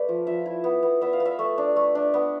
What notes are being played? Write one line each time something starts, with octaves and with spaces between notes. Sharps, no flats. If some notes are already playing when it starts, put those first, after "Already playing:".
Already playing: A3 B4 D5
F3
F3 E5
E4
B3
B3
B3 E5
F5
B3
E5
A3
D4
A3
D4
B3